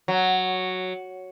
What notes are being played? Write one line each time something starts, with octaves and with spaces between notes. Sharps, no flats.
F#3